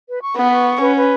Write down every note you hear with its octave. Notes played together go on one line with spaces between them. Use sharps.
B4
C#6
B3 B4
C#6
F#5
C#4 B4
B4